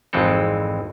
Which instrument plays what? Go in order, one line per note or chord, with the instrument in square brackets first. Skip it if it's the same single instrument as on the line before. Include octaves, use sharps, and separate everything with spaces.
[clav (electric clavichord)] G#1 F2 E3 G#3 C4 A4